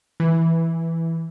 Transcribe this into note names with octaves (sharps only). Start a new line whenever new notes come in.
E3